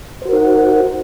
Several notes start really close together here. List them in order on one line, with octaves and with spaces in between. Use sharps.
C5 F#4 A#4 D#4 F#5